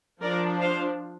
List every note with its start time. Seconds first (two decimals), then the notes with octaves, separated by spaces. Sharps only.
0.23 F3 D4 A#4 D5
0.61 C5 F5